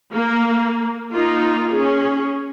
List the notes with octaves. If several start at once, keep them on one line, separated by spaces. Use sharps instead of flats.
A#3
A#3 D#4 F4
C#4 G#4